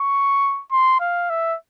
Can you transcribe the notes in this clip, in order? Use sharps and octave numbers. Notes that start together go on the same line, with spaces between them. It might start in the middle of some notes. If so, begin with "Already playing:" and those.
Already playing: C#6
C6
F5
E5